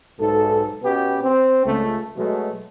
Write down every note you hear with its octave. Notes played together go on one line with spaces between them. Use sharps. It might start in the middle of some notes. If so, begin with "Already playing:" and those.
B1 G#2 A4
B2 B3 C#4 G4
C4
C#2 A3
B2 F#3 G#3 A3